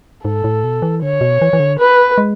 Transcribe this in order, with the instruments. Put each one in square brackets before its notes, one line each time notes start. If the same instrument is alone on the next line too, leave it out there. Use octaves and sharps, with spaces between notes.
[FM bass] G#2 [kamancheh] A4
[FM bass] A2
B2
E3
[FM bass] D3 [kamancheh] C#5
[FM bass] B2
E3
E3
D3
[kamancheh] B4
[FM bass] G#3